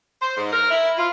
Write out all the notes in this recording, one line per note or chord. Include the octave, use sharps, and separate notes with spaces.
C5
G#2
A#4
E4
F4